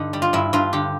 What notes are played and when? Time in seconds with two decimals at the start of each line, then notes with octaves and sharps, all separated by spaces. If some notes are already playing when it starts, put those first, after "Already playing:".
Already playing: G2 D3 D#4
0.13 G3
0.22 F4
0.33 G2 E4
0.53 G2 F4
0.73 D3 G4